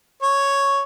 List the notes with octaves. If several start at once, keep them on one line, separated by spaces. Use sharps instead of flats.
C#5